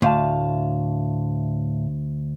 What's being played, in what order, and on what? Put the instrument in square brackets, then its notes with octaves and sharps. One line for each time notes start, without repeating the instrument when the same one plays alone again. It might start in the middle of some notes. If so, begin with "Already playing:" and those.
[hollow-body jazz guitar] D2 [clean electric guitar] A2 F5 A5